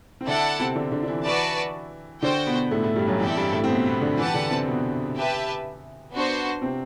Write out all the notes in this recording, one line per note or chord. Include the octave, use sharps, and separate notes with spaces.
C4
D3 D4 E4 A4 D5 F#5 A5
C3 C4
D3 D4
D3 D4
D4
E3 E4
F#4 B4 D5 A5
D3 D4 F#4 C5 G5
B2 B3
A2 A3
A2 A3
G2 G3
F#2 F#3
E2 E3 C4 E4 A4 D5 G5
G2 G3
A2 A3
C4
B2 B3
B2 B3
D3 D4
E3 E4 G4 B4 F#5 A5
D3 D4
C3 C4
B2 B3
G4 B4 E5 A5
B3 D4 F#4 C5
C3 C4